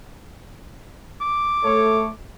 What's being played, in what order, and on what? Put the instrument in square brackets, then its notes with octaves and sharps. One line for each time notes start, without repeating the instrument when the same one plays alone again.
[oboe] D6
[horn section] A3 A4 C#5